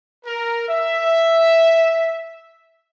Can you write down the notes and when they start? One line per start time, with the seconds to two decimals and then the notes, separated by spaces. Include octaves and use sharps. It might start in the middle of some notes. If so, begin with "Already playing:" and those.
0.25 A#4
0.68 E5